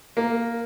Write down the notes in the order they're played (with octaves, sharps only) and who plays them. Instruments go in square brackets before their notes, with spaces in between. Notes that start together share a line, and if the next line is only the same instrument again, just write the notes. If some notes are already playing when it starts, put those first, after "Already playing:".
[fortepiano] A#3